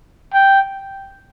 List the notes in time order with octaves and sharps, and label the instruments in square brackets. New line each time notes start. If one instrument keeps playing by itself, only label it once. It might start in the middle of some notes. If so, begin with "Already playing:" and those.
[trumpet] G5